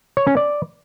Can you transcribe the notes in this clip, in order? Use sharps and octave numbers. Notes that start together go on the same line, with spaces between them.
C#5
C#4
D5